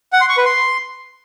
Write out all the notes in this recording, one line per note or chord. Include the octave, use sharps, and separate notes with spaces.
F#5
C6
C#6
B4
C6